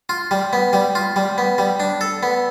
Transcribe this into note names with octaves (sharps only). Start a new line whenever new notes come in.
F4
G3
B3
G3
F4
G3
B3
G3
D4
A4
B3